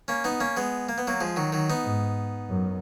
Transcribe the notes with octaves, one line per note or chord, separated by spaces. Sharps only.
A#3 C#4
B3 D#4
A#3 C#4
G#3 B3
A#3
B3
F#3 A#3
F3 G#3
D#3 F#3
D#3 F#3
B3 D#4
G#2
F#2